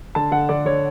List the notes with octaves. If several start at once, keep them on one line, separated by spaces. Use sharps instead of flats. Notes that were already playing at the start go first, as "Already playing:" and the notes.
D3 A5
D3 F#5
D3 D5
D3 C#5